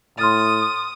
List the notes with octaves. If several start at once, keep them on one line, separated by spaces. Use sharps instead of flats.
A2 C6 D#6 F6 A6